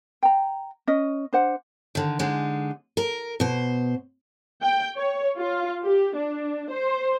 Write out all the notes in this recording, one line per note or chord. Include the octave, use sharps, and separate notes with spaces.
G5 A#5
C#4 D#5
D4 C5 F#5
D3 D#3
D3 G#3 D#4
A#4
B2 C5
G5
C#5
F4
G4
D4
C5